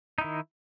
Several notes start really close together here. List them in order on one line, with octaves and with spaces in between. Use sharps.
D#4 E4 D#3